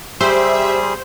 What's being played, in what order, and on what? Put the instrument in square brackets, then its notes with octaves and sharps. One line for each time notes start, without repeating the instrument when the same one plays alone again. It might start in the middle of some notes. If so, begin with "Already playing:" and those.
[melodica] G3 G#4 [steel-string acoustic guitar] G4 [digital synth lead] C5 [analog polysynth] E5